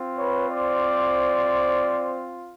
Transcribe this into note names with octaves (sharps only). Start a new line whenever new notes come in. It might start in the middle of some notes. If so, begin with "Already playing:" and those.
Already playing: C4 F4
B4 C#5
C5 D5